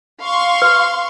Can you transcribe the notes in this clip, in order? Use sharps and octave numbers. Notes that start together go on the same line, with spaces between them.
F5 C6 C#6
B4